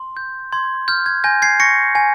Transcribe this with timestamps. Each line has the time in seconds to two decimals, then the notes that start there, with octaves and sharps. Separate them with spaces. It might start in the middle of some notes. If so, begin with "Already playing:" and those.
Already playing: C6
0.17 G6
0.52 C6 G#6
0.88 F6 G6
1.06 G#6
1.24 G#5 G6 A#6
1.42 G#6 C7
1.60 C#6 A#6 C#7
1.95 G#5